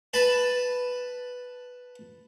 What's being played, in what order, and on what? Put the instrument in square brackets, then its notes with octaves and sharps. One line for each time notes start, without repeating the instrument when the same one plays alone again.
[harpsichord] B4 A5 B5